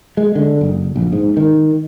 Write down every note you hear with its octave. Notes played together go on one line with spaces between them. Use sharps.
G#3
D3
F#1
A#1
G#2
D#3